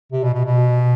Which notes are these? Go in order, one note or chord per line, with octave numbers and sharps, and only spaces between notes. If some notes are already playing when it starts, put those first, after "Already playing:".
C3
B2
B2
B2